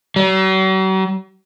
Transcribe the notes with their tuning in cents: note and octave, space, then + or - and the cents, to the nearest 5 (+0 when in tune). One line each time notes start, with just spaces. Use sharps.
F#3 +45